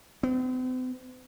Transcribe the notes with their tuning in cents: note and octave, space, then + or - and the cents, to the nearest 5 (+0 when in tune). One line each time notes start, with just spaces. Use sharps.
C4 -45